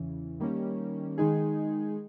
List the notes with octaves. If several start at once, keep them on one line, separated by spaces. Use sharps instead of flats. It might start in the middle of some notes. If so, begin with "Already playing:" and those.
Already playing: E2 C#3 E3
D#3 G3 A#3 C#4
D#3 G#3 D#4 G#4